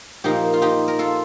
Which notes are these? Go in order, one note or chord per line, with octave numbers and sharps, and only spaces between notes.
A#2 F3 A#3 D#4 G4
F4
D#4 G4
A#4
F4 A4